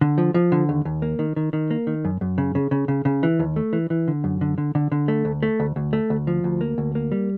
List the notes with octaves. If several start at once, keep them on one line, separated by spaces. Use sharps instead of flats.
D3
F3
F3
D3
D#2
D#2
A#3
D#3
D#3
D#3
A#3
D#3
F#2
F#2
C#3
C#3
C#3
C#3
C#3
E3
D#2
A3
E3
E3
D3
F#2
D3
D3
D3
D3
A3
D2
A3
D2
D2
A3
D2
F3
D2
A#3
D2
A#3
G3